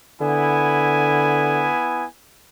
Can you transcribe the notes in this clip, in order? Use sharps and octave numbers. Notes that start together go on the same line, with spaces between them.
D3 B3 E4 G#5